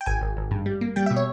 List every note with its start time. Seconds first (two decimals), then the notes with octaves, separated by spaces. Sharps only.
0.01 G5
0.06 G#1 G#5
0.21 G#1
0.37 G#1
0.51 G2
0.66 G3
0.81 A#3
0.96 G3 G5
1.06 B2 E5
1.16 C#5